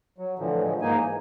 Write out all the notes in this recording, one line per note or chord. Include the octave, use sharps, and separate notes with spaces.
F#3
A2 D3 E3 F3
F3 F#3 G#3
G#2 A#3 D#4 G#5
E3